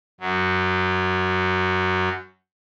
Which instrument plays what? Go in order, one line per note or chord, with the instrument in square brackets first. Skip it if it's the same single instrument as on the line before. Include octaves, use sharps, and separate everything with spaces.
[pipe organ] F#2 F#3